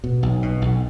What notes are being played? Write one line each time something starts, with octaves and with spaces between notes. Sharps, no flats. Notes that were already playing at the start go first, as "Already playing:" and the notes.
B2
B1
B2
B1